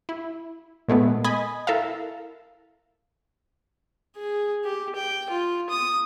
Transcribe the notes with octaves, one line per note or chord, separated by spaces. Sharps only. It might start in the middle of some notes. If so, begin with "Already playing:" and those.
E4
A#2 G#3 A3 B3
D#5 G#5 B5 D#6
E4 A4 A#4 E5 F5
G#4
G4
G5
F4
D#6